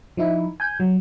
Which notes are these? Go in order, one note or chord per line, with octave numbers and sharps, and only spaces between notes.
F3 D#4 E4
G#5 G6
F#3